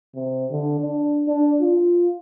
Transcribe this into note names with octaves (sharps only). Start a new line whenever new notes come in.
C3
D3
D4
D4
F4